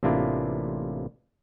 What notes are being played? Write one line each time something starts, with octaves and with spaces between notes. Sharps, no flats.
A1 C3 A#3 D4 E4 F4